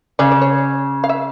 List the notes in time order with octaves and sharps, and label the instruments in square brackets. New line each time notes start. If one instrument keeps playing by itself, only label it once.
[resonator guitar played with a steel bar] C#3 [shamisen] D5
[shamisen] D5
C#5
F5
E5